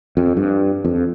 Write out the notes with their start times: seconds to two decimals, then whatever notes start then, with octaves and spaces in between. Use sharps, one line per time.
0.17 F2
0.37 G2
0.85 F2